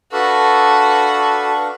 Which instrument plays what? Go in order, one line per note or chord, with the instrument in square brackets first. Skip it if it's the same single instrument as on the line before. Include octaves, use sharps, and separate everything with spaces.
[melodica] D4 F5 C#6 [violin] F#4 [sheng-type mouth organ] A4 B4